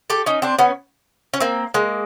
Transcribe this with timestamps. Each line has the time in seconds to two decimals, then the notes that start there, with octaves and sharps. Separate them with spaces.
0.10 G4 A4
0.26 C#4 D#4
0.42 C4 D4
0.59 B3 C#4
1.34 C#4
1.40 A#3 C4
1.74 G#3 A#3